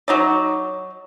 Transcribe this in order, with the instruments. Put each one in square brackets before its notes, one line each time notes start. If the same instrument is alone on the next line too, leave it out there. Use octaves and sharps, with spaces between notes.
[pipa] F#3 D#4 D5